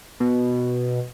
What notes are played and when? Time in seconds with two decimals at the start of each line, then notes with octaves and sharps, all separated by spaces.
0.20 B2